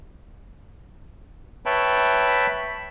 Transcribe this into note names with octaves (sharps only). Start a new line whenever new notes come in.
B4 C#5 E5 G5 A5 B5